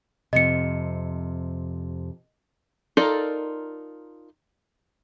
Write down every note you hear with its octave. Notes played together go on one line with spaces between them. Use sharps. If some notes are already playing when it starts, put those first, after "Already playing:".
F2 C3 D#5 C#7
D#4 F4 A4 A#4 D5